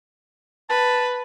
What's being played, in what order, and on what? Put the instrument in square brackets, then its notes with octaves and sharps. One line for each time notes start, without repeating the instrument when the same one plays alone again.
[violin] B4 [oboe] A5